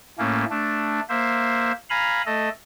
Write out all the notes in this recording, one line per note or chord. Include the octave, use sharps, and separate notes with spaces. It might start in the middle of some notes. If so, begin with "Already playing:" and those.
A2 A3 A#3 C#4
A3 D4
A#3 C5 E5
F5 G#5 A#5 B5
A3 A4 D#5